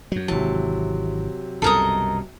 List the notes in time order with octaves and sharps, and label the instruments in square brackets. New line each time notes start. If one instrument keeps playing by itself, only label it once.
[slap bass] F#2 F#3
[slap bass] G#1 E3 [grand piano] C3 F#3 [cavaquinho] A5
[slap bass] C2 F#2 B2 [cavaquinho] A4 A#4 D#5